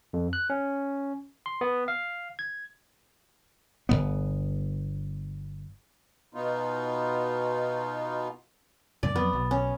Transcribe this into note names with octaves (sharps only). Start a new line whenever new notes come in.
F2
F#6
C#4
C6
B3
F5
G#6
G1 E2 B3
B2 B3 D#4 F4
C#2 G2 A#2 D5
F2 F#3 B3
B1 B2
C#4